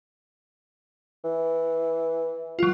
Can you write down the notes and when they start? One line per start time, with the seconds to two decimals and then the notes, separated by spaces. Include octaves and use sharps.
1.24 E3
2.59 F#3 F4